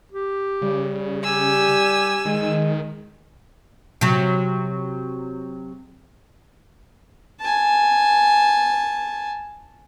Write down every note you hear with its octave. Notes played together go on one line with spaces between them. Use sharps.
G4
C#3 G3
G4 G#5 E6
D#3 G#3
C3 F#3
G#5 A5